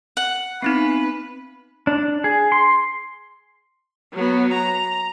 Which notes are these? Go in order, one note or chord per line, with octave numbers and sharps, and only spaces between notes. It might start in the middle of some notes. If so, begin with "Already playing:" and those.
F#5
B3 C4 D#4 B4
D4
G#4
C6
F#3 B3
A#5